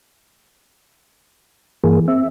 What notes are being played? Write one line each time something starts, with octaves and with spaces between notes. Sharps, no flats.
G2 E3 A#3 G#4
C4 E5